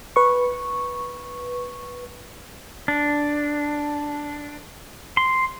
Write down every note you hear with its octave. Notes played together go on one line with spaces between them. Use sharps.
B4 C#6
D4
C6